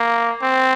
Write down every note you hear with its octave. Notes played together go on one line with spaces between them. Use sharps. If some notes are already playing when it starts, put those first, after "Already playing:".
Already playing: A#3
C4